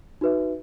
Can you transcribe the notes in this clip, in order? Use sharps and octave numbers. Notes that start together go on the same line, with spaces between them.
D#4 F#4 B4 E5